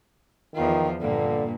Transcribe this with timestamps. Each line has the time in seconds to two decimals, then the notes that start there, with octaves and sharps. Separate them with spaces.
0.55 E2 D#3 F3 F4
1.01 G2 A#2 D3 A#3